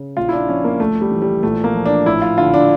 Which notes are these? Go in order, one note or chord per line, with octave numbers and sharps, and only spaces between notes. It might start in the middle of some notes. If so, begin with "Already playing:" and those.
Already playing: C#3
A#1 F4
E4
D4
F3 C#4
A#3
D2 A3
G3
E3
G3
A#1 A3
A#3
F3
D4
A1 E4
F4
D3 F4
D4